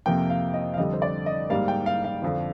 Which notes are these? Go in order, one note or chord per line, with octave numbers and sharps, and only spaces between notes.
F2 C3 F3 A#3 G5
F5
D#5
F5
F2 D3 G3 D#5
C5
D5
D#5
G#2 G3 A#3 F5
G5
F5
F5
F2 D3 F3